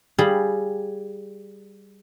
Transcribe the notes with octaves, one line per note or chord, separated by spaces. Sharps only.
G3 G4 G#4 F5 B5